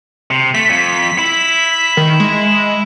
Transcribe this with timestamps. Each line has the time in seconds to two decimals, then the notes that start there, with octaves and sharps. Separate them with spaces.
0.31 C3
0.55 A3 B6
0.70 F2
1.19 E4
1.97 D#3
2.20 G#3